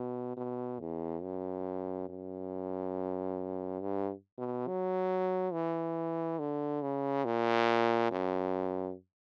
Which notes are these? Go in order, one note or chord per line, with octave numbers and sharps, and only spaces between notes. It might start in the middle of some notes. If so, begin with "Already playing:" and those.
Already playing: B2
B2
E2
F#2
F#2
G2
B2
F#3
E3
D3
C#3
A#2
F#2